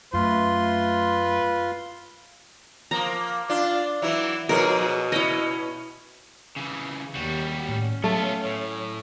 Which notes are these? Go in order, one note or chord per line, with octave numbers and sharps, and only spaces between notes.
F#2 A3 F4 B4 C6
F3 A#3 A#5
D4 F4
E3 F#3 E4
G#2 B2 F3 G#4 A#4
C#4 E4 D#5
C#3 E3
D#2 G3 F#4
A2 C#4
F#3 A3 B3 F4
A2